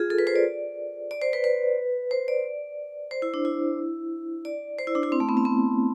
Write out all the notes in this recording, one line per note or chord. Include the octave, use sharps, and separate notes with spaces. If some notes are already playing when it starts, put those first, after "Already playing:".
Already playing: F4 G#4
A4
B4
C5
D5
D5
C5
B4
B4
C5
D5
C5
E4
D4
E4
D5
C5
E4
D4
E4
C4
A3
B3
C4
B3